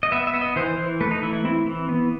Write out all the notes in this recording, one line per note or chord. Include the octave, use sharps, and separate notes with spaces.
D#5
B3 E5
E5
B3
D#5
E3 C5
E3
A3 B4
D#4
E3 E4
E4
C4 E4
E3
B3